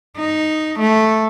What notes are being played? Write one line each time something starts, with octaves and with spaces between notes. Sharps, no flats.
D#4
A3